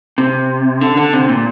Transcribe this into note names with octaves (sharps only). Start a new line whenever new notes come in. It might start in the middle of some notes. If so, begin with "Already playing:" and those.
C3
D3
D3
C3
A#2